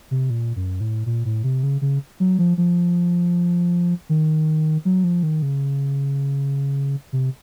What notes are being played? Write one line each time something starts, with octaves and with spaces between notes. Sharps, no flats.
C3
A#2
F#2
A2
A#2
A2
C3
C#3
C#3
F#3
F3
F3
D#3
F#3
F3
D#3
C#3
C3